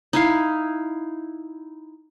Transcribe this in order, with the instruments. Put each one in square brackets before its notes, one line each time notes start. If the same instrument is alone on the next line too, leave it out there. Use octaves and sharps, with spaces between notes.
[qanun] D#4 E4 F5